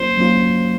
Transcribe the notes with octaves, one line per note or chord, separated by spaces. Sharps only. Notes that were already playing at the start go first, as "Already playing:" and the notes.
Already playing: F#3 A#3 C#4 F4 C5
F#3 A#3 C#4 F4